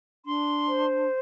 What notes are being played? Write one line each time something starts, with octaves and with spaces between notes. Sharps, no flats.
D4 C6
C5